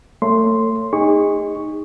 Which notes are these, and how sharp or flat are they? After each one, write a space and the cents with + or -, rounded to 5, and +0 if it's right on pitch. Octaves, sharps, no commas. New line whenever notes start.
A3 +30 C#5 +0 C6 +0
D#4 +0 G#4 -35 C#6 +0